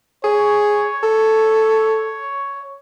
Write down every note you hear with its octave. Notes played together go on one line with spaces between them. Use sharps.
G#4 C#5
A4